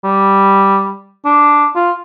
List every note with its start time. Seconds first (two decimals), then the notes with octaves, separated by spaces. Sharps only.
0.04 G3
1.26 D4
1.76 F4